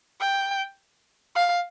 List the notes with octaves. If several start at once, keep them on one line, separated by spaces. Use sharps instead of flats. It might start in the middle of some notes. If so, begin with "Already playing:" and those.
G5
F5